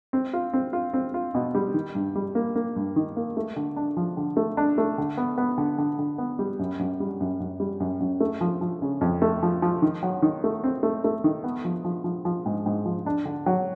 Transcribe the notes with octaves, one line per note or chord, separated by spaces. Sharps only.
C4
F4
C4
F4
C4
F4
B2
G3
D#3
G2
G3
A#3
A#3
G2
D#3
A#3
A3
D3
D4
F3
D3
A3
D4
A3
D3
B3
B3
D3
D3
D3
B3
G3
F#2
F#2
G3
F#2
F#2
G3
F#2
F#2
A3
F3
F3
C#3
F2
A3
F3
F3
D#3
F#3
D#3
A3
C4
A3
A3
D#3
B3
F3
F3
F3
F3
G#2
G#2
F3
D4
D3
F#3